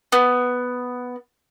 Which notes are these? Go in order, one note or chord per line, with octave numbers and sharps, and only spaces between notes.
B3